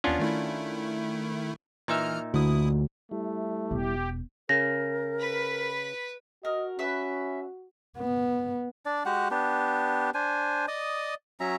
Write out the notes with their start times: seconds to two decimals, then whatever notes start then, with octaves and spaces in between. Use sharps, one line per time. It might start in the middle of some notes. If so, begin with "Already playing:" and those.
0.04 D#2 B3 C#4 D4 F4
0.19 D#3 A3 E4
1.88 A#2 E3 D#4 E5 A#5 F6
2.34 D2 E4 D#6
3.11 G3 A3 E4
3.71 E1 G4
4.49 C#3 A#4 A#6
5.19 B4 B5
6.45 F#4 A#4 D#5
6.79 C#4 B4 E5
7.98 B3
8.86 D4 D5
9.06 G#3 F#4 G4 F#5
9.31 B3 D4 G4
10.14 D4 C5 G#5
10.68 D5 D#5 D#6
11.40 F#3 C#4 E5 A#5